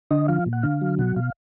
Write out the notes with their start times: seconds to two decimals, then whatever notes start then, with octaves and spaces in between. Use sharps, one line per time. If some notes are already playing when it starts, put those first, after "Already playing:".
0.11 D3 D#5
0.28 F3 F5
0.46 A#2
0.53 F#5
0.63 D3 F5
0.81 F#3
0.98 B2 F#5
1.16 B2 F5